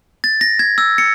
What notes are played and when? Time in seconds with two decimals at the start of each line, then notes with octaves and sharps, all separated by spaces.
0.24 A6
0.41 A#6
0.59 G#6
0.78 E6
0.98 C#7